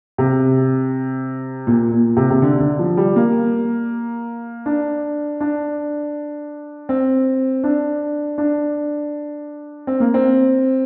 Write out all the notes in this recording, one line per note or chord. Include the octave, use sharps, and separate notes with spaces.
C3
A#2
A#2
C3
C3
D3
D3
F3
G3
A#3
D4
D4
C4
D4
D4
C4
A#3
C4